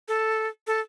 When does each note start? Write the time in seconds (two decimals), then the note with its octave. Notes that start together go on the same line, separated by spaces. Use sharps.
0.08 A4
0.67 A4